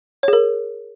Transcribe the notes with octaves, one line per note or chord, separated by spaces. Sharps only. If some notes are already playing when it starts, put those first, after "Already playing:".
G#4 A#4 C#5